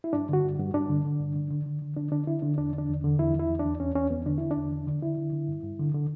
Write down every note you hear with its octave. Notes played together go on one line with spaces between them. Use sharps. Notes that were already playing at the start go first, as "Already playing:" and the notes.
E4
G2 D4
D3 F#4
G2
G2
G2 D4
D3
D3
G2
D3
D3
D3
D3
D3 D4
D3 D4
D3 E4
D3 D4
E2 D4
D3
D4
E2
D3
E2 E4
E2
E4
E2
D4
E2
E2 C#4
E2 C#4
E2 B3
D3 D4
D3 E4
D4
E2
D3
D3
D3 E4
D3
D3
G2
G2
D3
D3